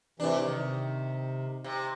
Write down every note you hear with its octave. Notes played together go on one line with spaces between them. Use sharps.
G#2 C3 E3 D4
C3 D#3
C3